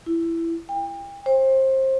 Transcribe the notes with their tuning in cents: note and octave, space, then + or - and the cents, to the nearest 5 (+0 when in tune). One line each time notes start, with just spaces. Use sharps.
E4 +15
G5 +35
C5 +25